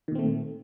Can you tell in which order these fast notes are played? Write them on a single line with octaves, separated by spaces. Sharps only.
D#3 A#2 C4 A3